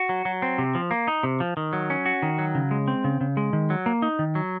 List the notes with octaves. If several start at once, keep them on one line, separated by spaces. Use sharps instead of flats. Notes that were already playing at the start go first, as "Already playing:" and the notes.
Already playing: F#4
F#3
F#3
C4
C3
F3
A#3
D#4
C3
F3
D#3
F#3
C#4
F#4
D#3
F#3
C#3
G#3
C4
C#3
C#3
G#3
D#3
F#3
A#3
D#4
D#3
F#3